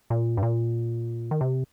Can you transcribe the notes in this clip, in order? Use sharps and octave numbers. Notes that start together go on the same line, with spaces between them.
A#2
G2
A#2
D#3
C3